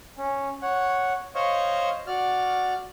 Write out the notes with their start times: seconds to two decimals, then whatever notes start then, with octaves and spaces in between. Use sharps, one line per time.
0.18 C#4
0.62 C#5 F#5
1.35 C5 C#5 D#5 F5 C#6
2.07 F#4 D5 F6